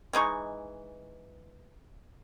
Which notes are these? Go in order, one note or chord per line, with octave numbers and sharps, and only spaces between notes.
E3 G#3 D#4 C#6